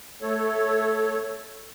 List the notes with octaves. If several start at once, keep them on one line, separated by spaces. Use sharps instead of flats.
A3 A4 C#5